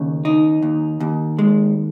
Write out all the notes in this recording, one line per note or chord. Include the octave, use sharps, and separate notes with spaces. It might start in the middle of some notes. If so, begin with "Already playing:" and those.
Already playing: D#2 C#3
D#4
D#2
D#2
G#3